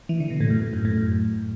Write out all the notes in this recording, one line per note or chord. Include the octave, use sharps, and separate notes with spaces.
E3
D3
B2
A2
F#2
A2
F#2
A2
F#2